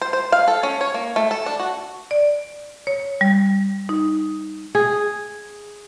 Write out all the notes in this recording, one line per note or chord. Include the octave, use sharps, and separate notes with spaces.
C5
C5
F5
A4
C#4
C#5
A#3
A3
A4
D4
F#4
D5
C#5
G3
D#4
G#4